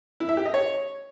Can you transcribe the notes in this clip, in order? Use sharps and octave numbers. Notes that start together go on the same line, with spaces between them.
E4
E5
G4
D#5
C#5